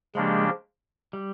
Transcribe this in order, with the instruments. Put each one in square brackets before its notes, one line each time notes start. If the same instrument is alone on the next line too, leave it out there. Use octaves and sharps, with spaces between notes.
[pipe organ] C#3 F3 A#3 D4 G4 [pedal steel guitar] G#3
[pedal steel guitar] G3